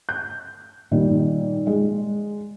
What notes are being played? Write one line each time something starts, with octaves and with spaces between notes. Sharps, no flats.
G6
A#2 D#3 G3
G#3